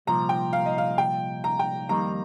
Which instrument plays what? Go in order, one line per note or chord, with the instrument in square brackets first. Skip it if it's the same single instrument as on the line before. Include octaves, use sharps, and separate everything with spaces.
[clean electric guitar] C2 A#2 F3 [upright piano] A#5
[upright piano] G5
F5
D#5
F5
G5
A#5
G5
[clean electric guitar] F2 D#3 G3 A#3 D#4 [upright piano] A#5